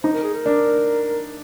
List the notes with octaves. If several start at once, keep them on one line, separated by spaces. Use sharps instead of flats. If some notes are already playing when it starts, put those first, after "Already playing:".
D#4 C5
A#4
G#4
A#4
D4